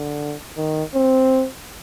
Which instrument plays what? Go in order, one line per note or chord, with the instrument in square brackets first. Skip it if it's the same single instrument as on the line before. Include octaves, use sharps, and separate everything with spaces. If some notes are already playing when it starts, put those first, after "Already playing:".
Already playing: [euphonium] D3
D#3
C4